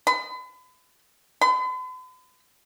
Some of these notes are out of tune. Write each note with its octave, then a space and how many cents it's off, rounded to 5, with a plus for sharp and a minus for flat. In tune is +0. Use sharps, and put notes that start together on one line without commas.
B5 +40
B5 +45